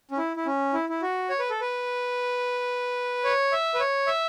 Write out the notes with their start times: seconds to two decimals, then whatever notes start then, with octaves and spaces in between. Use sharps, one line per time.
0.11 C#4
0.18 E4
0.37 E4
0.46 C#4
0.73 E4
0.89 E4
1.02 F#4
1.30 C#5
1.39 B4
1.50 A4
1.61 B4
3.24 C#5
3.52 E5
3.74 B4
3.80 C#5
4.07 E5